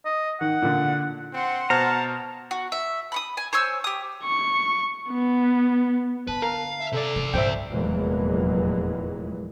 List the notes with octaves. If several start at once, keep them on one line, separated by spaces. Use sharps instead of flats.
D#5
D#3 F#5
A#2 D3
C4 F#5 C6
B2 C5 A5 A#5 F6
F#4
E5
B5 C#6 D#6
G#5
C5 C#5 G#5 E6
G4 D#6
C#6
B3
D3 B4 A5
A#4 F5
E5
C3 A4 D5
D#3
G2 A#2 C5 E5 G5
F1 E2 A#2 E3 F#3 G#3